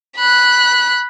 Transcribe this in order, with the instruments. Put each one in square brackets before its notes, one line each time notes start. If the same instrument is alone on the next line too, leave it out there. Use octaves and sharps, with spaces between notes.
[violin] B5 F#6